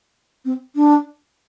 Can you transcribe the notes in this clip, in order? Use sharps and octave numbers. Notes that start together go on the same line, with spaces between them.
C4
D4